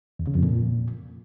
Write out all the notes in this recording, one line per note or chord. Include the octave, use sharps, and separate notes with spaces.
E2
C#3
F2
A#2